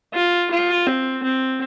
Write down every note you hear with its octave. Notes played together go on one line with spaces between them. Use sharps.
F4
F4
C4
C4